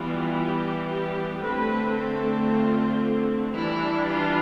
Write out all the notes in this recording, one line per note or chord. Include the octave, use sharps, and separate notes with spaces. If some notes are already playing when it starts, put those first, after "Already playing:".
Already playing: E3 G3 B3 F4
G4
G4
D3 A3 C4 B4
A4
F4
E3 G3 D4 E4
F4